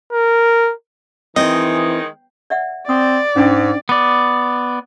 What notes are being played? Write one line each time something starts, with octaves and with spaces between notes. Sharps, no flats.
A#4
D#3 E3 G#3 C4 D#4 D#5
D5 E5 F#5
C4 D5 D#6
G#2 C#4 D4 G5
B3 D5